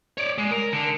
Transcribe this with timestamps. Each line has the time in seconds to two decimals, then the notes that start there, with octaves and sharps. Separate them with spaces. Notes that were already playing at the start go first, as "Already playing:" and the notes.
0.18 C#5 D5
0.38 G#3
0.51 A#4
0.73 D3